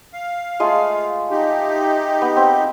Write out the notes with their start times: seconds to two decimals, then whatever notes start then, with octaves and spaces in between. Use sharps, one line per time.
0.13 F5
0.60 G#3 A3 F4
1.31 D#4 G4
2.22 B3
2.36 C4